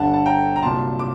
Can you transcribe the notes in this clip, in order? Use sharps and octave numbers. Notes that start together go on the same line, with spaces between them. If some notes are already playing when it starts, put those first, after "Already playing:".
Already playing: G1 G2 D3 F#5 A5
A5
G5 A#5
A#5
C2 A#2 F#3 A5 C6
D6